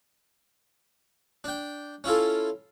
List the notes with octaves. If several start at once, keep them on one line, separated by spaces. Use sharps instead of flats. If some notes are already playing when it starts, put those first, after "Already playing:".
D4 G5
C#4 E4 F4 A4